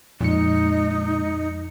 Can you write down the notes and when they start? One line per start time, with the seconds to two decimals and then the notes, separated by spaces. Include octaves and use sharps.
0.21 F2 A#2 G#3 D#4 C#7